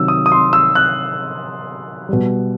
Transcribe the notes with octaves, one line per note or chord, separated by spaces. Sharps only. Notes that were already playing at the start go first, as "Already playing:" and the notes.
Already playing: C3 D#3 F#3 E6
D#6
D#6
C6
E6
F#6
B2 G3